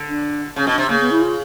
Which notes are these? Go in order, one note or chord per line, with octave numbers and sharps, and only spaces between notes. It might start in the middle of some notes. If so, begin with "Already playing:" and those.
Already playing: D3
D4
C#3 C#4
B2
D4
C3
C#3 A#3
B3
E4
F4